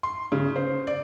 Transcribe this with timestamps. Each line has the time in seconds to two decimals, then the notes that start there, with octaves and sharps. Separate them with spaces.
0.03 C6
0.32 C#3
0.56 C5
0.87 D5